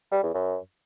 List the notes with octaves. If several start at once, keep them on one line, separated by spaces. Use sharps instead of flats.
G3
E2
F#2